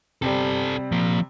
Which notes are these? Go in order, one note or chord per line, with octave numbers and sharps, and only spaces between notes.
C3 G3 G4 A4
F3 A#3